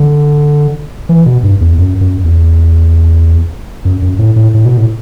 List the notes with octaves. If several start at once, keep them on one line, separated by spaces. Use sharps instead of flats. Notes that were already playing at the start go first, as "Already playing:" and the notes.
Already playing: D3
E3
B2
G2
E2
F#2
F#2
E2
F#2
F#2
A2
A2
A2
B2
A2